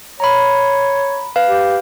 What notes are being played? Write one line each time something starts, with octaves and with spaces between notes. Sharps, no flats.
C#5 A#5 B5
B4 F5
G4